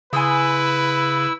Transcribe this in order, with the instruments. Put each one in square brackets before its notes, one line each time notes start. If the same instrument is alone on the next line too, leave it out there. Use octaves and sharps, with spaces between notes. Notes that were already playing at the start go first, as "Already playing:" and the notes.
[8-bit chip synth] C#3 [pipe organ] E4 E6 [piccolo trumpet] B4 [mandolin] G#5 C6 D#6